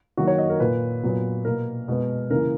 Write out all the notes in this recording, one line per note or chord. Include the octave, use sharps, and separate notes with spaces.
D#3 F#3 A#3 F#4
C#5
D#5
A#4
A#2 A#3 B4
A#2 F#3 B3
B2 A#3 A#4
B2 G#3 B3
C#3 E3 A#3 A#4